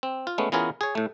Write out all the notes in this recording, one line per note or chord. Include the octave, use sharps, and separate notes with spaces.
C4
F4
G#3 A3 B3 C#4
E3 B3 C#4 F4 G#4 A#4
G#4 C#5
A2 A3